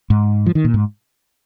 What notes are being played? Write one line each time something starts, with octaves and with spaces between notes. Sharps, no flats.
G#2
F3
D#3
A#2
G#2